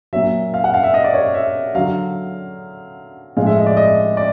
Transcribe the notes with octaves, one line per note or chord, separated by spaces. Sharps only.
A#2 F#3 E5
F5
F#5
F5
E5
D#5
D5
C#5
E5
D3 F#3 F5
A2 F3 G#3 F5
E5
D#5
D5
D#5
D5